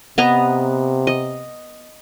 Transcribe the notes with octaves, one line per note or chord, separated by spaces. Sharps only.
C3 B3 D#5 A#5
D#5